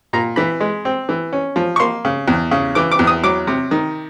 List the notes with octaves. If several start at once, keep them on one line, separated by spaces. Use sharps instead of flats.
A#2 A#5
E3 B5
G#3
C4
E3
C#4
F3
C#6
A#3 C6
C#3
E2
C#3
E3 D6
D6
E2
D#6
F#3 D6
C3
D#3